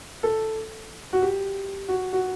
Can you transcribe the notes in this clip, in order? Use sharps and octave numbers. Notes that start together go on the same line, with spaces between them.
A4
F#4
G4
F#4
F#4